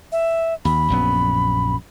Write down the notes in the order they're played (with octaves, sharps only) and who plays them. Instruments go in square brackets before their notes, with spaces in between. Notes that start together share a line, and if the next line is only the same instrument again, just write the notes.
[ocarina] E5
[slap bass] D#2 [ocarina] B5
[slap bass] A#1 F#2 B3